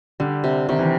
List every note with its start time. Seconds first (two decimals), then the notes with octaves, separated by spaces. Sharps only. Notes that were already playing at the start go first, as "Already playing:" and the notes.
0.20 D3 G3
0.44 C3
0.69 C3 D#3
0.79 E3